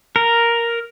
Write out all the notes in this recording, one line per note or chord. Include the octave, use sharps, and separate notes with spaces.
A#4